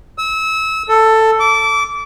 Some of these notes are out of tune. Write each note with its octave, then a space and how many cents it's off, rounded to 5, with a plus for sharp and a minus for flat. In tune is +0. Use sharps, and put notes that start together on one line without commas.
E6 -30
A4 +10
D6 -25